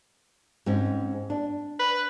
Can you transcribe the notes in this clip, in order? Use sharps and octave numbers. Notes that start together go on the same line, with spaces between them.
G#2 C4 C#4
D4
B4